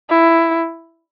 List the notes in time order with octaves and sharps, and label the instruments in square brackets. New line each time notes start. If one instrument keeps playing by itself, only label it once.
[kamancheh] E4